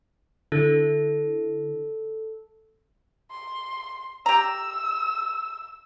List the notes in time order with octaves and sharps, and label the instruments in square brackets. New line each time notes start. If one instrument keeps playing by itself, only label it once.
[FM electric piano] D3 E4 [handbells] A4
[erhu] C6
[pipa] G4 A#5 [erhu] E6